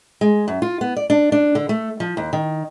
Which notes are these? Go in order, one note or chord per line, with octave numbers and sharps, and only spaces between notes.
G#3
F#2
F4
B3
D5
D4
D4
D3
A3
F3
D#2
D#3